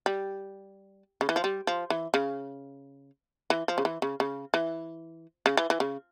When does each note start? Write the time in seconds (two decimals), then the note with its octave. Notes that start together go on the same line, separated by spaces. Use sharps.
0.06 G3
1.21 C#3
1.29 E3
1.36 F3
1.44 G3
1.67 F3
1.90 E3
2.14 C#3
3.50 E3
3.68 F3
3.78 C#3
3.85 E3
4.02 C#3
4.20 C#3
4.54 E3
5.46 C#3
5.57 E3
5.70 E3
5.80 C#3